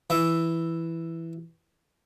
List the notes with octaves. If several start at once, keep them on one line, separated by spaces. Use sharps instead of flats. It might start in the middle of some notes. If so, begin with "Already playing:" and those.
E3 E5